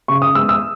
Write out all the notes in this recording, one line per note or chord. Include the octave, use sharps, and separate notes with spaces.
C#3 C#6
D#6
G#3 B3 E6
E6